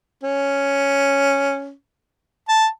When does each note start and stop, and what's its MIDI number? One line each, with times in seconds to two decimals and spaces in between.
0.23 1.72 61
2.49 2.66 81